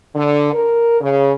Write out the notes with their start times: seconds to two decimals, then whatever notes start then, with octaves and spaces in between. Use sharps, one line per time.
0.15 D3
0.53 A#4
1.01 C#3